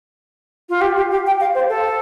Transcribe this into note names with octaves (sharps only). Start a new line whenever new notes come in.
F4
G4
G4
G4
G5
F5
C5
A4